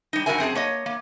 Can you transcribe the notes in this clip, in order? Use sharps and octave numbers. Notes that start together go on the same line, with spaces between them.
G3 D#4
G2 A#2 F#4 A#4 E5 G#5
F#2 C4 G#4 A5
A#3 C#5 D#5
A#3